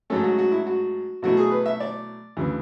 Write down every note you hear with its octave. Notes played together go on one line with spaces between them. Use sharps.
G#2 F#3 A3 C#4 A4
F#4
F#4
E4
F#4
B2 F#3 A3 E4 F#4
G#4
B4
E5
D5
D2 C#3 E3